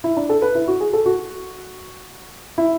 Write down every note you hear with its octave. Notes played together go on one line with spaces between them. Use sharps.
E4
D4
A4
B4
E4
F#4
G#4
A4
F#4
E4